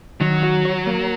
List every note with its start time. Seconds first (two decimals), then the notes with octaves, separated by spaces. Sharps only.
0.21 D#3 F#3
0.43 F#4
0.65 C#5
0.87 A#3